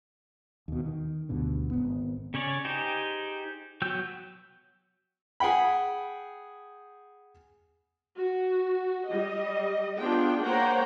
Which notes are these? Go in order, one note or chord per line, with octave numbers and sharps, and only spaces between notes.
D#2 B2
D#3
D2 G2 B2 D3
G#1 B3
C#3 C#4 C#5 D5
D#4 G4 G#4 C5
F#3 B3 G5 E6 G6
G#4 F#5 G5 B5
F#4
G3 D#5
B3 D4 F4 G#4 G5
A#3 C5 C#5 F#5 G5 A#5